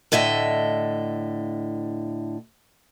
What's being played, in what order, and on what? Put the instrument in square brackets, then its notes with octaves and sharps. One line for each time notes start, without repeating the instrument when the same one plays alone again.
[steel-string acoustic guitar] A2 D3 D#5 E5